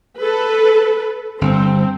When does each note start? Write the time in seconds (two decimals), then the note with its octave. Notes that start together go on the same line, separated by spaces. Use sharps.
0.21 A4 B4
1.41 G1 C4